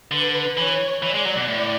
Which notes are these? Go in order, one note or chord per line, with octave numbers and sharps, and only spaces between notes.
D3 B4
E3 C#5
E3 D5
G#3
F#3
B2
A2 D5